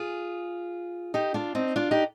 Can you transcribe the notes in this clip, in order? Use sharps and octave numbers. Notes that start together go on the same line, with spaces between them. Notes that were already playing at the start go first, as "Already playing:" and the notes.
Already playing: F4 G#4
D#4 G4
D4 F4
C4 D#4
D4 F4
D#4 G4